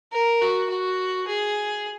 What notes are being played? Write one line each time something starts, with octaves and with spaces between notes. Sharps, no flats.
A#4
F#4
F#4
G#4